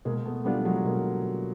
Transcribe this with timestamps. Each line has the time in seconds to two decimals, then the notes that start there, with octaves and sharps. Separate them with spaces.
0.05 B2 G#3 A#3
0.25 A3 B3
0.45 F#3 G3 A3 B3 D4 F4
0.65 F#3 G#3
0.85 B2 G#3 A#3